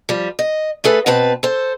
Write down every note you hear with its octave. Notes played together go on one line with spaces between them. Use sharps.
F3 G3
D#5
A3 G#4 A4 B4
B2 C4 B4 A5
A4 C5